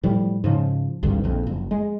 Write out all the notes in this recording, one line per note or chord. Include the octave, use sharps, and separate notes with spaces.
A2 F3 G3
G#2 C#3 F3
G#1 D2 G2 D3
A#1 F2
F#1
G#3